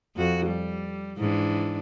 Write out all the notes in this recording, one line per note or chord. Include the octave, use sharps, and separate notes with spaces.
F2 F#4
G3
G#2 E3 D4